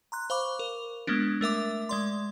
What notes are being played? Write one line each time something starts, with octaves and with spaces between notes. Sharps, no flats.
A#5 C6 F#6
C5 F5 B5 C#6 D6
A#4
G#3 A#3 B3 D4
A3 A#4 E5 D6
G#3 D5 C6